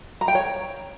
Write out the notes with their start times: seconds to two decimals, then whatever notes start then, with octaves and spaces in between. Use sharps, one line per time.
0.21 A#5
0.28 G5
0.35 C#5